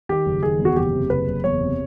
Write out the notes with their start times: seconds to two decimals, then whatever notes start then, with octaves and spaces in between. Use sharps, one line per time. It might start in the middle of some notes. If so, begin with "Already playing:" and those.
0.09 D#3 G4
0.26 F#1
0.42 D#3 G#4
0.59 E2
0.65 F#4
0.76 F#1 G4
0.93 C3
1.10 F#1 B4
1.27 F#1
1.44 E2 C#5
1.60 C3